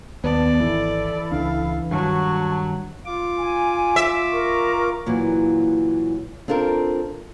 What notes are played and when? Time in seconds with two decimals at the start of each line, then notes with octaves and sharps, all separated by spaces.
0.24 D#2 B3 D5 A5
0.61 G#1 E3 E4 A4
1.32 C#2 D4 F5
1.91 G2 D#3 F#3 A5 C#6
3.06 F4 D6
3.39 G#5
3.96 E5
4.33 A#4 C#6
5.06 A#2 E3 F#3 A#3
6.48 C4 D4 F4 A4 A#4